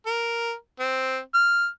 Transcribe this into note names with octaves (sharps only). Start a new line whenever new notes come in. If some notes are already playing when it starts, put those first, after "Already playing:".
A#4
C4
F6